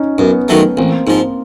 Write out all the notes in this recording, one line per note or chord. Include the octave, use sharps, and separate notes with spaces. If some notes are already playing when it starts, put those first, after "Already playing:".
Already playing: C#4 D#4
F#2 B3 C#4
D#3 F#3 A3
A1 A#3 C4
G#2 F3